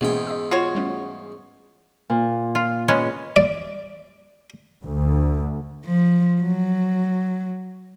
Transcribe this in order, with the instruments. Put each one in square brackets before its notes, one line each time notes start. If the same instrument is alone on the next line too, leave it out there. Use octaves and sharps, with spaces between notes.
[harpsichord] E2 G#2 G5 [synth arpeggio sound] B2 A#3 C#4
[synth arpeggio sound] D#5 D#6 E6
[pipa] F4 F#4 C#5
[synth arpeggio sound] G3 A3 C#4
[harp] A#2
[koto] F4
G#3 B3 C#4
[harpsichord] D5
[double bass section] D2
[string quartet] F3
F#3